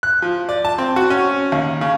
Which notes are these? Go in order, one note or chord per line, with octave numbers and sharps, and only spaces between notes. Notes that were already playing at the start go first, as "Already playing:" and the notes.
F#6
F3
D5
A5
C4
F#4
C#4
D#2
C#3